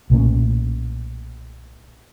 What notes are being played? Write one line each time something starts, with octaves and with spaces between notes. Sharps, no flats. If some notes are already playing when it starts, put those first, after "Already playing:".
B1 A#2 A3 C#4